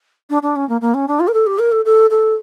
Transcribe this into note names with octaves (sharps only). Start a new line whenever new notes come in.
D4
D4
C#4
A#3
A#3
C#4
D4
F4
A#4
A4
G4
A#4
A4
A4
A4